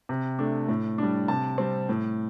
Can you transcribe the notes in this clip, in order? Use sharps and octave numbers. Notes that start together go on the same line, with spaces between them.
C3
A3 D4
A2
G3 D4
C3 A5
G3 C4
A2